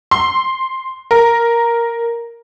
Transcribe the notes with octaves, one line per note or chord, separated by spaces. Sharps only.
C6
A#4